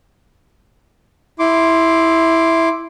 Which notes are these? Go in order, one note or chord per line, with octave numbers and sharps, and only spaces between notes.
E4 C6 D6